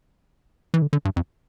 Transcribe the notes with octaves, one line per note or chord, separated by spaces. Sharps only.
E3
D3
D3
G2
F2